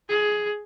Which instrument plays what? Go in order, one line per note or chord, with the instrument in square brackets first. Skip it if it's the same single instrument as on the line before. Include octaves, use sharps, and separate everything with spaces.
[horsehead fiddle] G#4